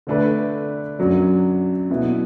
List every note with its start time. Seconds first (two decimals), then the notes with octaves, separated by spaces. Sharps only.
0.07 D3 A3 D4 B4
0.99 F#2 F#3 D4
1.90 B2 F#3 B3 E4